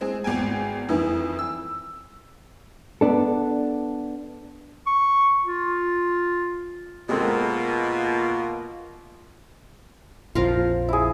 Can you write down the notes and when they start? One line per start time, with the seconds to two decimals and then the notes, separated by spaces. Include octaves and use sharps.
0.01 G#3 C4 G#4
0.24 G#1 E2 G5 G#5
0.89 F2 D#3 E3
1.39 E6
3.01 B3 D4 A4
4.87 C#6
5.44 F4
7.09 B2 G#3 A#3 C4 F4 A4
10.35 A#1 F2 F3 F4 A#4 F5
10.89 E4 G#4